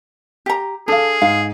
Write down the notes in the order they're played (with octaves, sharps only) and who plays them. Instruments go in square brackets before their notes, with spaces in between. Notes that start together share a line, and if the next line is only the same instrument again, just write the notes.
[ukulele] G4 A#5
[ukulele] D4 [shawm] G#4 [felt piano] A4 F5
[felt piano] G#2 [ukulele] F5